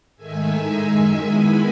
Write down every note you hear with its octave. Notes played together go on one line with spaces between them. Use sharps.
G#2 D#3 A3 E5 G#5
A2 G#3 D#4
F#2 D#3 G#3
D#3 G#3 B3 E4 G#5 B5